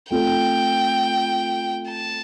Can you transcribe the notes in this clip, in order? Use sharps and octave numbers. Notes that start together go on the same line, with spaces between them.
A3 C4 F4 A4 G5
A5